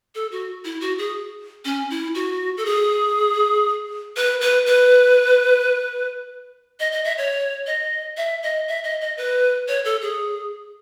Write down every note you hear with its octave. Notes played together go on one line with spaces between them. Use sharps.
A4
F#4
E4
F#4
G#4
C#4
E4
F#4
A4
G#4
B4
B4
B4
D#5
D#5
E5
C#5
D#5
E5
D#5
E5
D#5
D#5
B4
C#5
A4
G#4